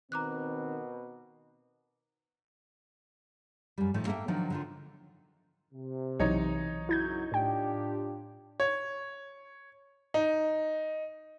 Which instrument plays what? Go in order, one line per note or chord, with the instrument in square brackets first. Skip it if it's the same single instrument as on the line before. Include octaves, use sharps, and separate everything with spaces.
[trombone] B2 [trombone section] D#3 C4 [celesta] A#5 D6 F#6
[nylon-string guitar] F#2 G3
A2 D#3 F3 A3
A#3 A4 E5 F#5 G5
D#3 F3 F#3 D4 D#4
D3 D#3 F4
[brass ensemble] C3
[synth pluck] B1 E3 F#3 [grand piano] D#4 C#5
[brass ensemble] F#2 C#3 F#3 [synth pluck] E4 G6 G#6
[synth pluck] A2 G5 [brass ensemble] D4 F4 G4
[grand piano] C#5
D#4